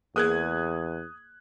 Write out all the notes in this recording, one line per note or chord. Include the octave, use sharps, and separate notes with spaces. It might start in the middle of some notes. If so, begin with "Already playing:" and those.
E2 A#3 G#4 A#4 D#6 F#6 G#6